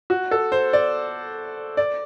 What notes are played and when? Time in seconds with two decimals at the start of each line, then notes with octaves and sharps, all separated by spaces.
0.10 F#4
0.31 A4
0.52 C5
0.73 D5
1.77 D5